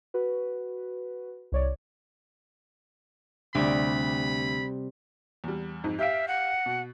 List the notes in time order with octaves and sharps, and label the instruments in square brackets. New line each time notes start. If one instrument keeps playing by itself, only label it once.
[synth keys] F#4 B4
C2 C#5 D5
[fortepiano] D2 [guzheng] C3 G3 [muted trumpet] B5
[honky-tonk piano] E2 G3
F2 G#2 D#4
[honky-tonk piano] G4 F5 D7 [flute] E5
[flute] F#5
[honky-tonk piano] B2